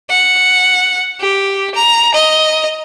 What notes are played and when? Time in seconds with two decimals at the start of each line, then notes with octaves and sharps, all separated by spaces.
0.10 F#5
1.20 G4
1.75 A#5
2.14 D#5